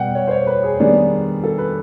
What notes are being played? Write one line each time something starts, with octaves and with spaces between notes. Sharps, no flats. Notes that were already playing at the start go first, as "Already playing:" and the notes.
Already playing: B2 G3 B3 F#5 G5
C#5
C5
C#5
B4
G#4
D#3 G3 B3 D4 G#4
A4
B4